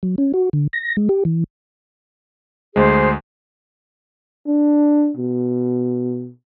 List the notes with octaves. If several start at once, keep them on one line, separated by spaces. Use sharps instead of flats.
F#3
C#4
F#4
D3
A#6
G#3
G4
E3
D2 G#3 G#4 C5
D4
B2